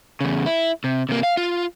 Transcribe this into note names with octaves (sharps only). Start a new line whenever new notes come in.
E2 C#3
E4
C3
C3 A#3
F5
F4